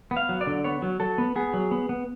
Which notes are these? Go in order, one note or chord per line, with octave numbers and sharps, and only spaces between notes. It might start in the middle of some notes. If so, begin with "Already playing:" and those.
B3
F5
F#3
D5
D3
B3 C#5
F#3
F#3 A4
B3
B3 G#4
F#3
B3
B3